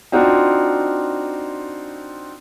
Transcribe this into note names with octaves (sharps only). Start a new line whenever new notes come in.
C4 D4 D#4 F4 F#4